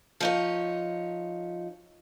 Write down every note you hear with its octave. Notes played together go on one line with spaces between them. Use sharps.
F3 D#4 C#5